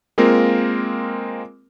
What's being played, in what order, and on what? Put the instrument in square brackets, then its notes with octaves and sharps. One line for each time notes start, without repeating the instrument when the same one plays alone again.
[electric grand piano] G#3 A#3 C4 F4 A#4